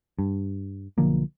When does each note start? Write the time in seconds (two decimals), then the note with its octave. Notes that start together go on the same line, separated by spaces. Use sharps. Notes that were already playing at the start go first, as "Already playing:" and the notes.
0.19 G2
0.98 B1 D3 F3 A#3